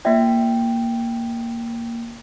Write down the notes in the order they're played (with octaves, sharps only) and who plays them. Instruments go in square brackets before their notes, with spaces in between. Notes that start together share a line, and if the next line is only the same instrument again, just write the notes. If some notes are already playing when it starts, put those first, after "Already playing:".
[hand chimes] A#3 G5 [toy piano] F4 D5 E5